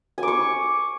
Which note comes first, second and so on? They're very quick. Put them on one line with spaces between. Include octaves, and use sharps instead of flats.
G#5 D6 C#6